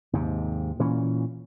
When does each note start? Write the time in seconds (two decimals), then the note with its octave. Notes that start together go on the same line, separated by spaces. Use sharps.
0.13 D#2 G#2 C3
0.79 A#2 E3 C#4